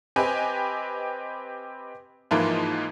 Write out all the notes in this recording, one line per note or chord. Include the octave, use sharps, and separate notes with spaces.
C4 G4 B4 D#5 G#5
G#2 E3 F3 A#3 F4